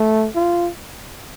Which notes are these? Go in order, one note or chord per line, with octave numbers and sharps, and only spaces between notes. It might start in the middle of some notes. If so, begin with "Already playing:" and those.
Already playing: A3
F4